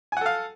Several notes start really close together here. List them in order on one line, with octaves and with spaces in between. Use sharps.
G#5 F#5 A4 F5